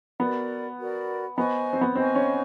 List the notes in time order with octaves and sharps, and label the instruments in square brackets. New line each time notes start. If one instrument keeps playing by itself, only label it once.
[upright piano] B3 [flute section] F#4 A#4 D5
[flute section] F#4 A#4 D5
[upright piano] B3 [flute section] C5 D#5 G#5 C#6
[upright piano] C4
B3
[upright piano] C4 [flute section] C5 D#5 G#5 C#6
[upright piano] C#4